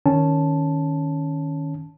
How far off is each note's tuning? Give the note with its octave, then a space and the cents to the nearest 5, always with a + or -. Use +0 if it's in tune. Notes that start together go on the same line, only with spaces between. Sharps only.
D#3 +0 C#4 +0 A5 +0